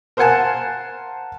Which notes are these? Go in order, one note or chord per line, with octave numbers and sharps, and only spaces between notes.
A#4 C5 F5 F#5 G#5 A5